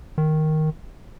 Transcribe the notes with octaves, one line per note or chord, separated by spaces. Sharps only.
D#3